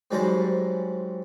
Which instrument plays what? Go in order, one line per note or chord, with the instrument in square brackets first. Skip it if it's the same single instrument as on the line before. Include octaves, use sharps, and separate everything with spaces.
[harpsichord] G#2 F#3 G3 C#4 A#4 C5